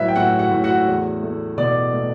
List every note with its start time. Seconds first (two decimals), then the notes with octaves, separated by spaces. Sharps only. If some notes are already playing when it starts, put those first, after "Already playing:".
Already playing: A2 F#3 E4 B4 E5
0.08 G5
0.16 A2 F#4 F#5
0.39 F#4 F#5
0.52 A2
0.64 F#4 F#5
0.87 E2
1.23 A3
1.57 B2 D5 D6
1.93 A3